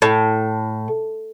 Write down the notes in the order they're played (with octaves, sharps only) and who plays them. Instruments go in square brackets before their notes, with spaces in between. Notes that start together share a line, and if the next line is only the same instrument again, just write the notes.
[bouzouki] A2